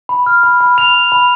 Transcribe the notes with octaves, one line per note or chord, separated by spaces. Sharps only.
B5
F6
B5
B5
B5 F7
B5
B5